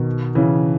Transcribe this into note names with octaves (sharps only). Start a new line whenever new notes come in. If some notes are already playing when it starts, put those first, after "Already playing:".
Already playing: B2 D#3
C#3 E3